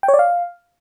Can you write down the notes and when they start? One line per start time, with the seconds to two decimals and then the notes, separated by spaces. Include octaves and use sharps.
0.03 G5
0.08 C#5
0.14 D5
0.19 F5